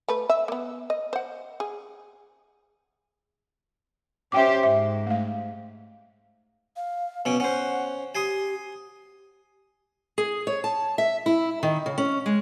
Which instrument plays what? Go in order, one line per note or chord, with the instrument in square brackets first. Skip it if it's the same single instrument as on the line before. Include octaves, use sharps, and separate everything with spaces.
[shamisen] A3 B4
E5
A#3 B3
D#5
C5 F#5
G#4
[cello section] C#4 G4 C5 [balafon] E5 G5 D6
[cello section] G#2 [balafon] E5
[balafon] A3 F5
[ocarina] F5
[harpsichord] B2 C#4 D6
[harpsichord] C#4 C5 [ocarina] F#5
[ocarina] G4 [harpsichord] G#5 C6 D#6
[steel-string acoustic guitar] G#4
C#5
A5
E5
E4
D#3
C#3
C#4
G#3